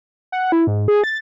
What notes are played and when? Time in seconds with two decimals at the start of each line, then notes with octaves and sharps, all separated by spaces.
0.32 F#5
0.52 E4
0.67 G#2
0.88 G#4
1.04 A6